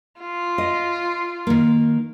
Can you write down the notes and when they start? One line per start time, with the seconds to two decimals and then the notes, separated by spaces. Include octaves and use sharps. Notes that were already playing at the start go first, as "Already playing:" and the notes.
0.21 F4
0.58 D#5
1.47 D#3 A#3